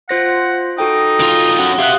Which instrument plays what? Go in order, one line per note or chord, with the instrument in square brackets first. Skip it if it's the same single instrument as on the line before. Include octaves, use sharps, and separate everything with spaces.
[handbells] F4 C5 A#6 [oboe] F#5
[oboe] D#4 [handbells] F#4 A4 G5
[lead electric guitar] D3 F4
[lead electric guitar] C#4 F#4 [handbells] F#5
[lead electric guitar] G4 E5 [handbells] F5 D#6 F#6